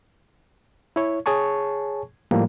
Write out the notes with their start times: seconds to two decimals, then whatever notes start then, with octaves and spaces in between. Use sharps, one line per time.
0.96 E4 C#5
1.26 G#4 C#5 G#5 A5 C#6
2.31 A2 F3 G3 A#3